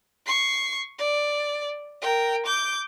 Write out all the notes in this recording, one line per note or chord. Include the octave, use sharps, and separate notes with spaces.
C#6 C7
D5
A#4 G5
D6 G6